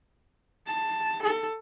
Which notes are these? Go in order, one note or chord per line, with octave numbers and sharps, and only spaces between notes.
A5
A4